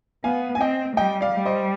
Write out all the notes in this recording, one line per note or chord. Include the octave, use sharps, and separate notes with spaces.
B3 F5 G#5
G#5
C4 D#5 G5
G3 D#5 G5
D5 F5
G3
C5 D#5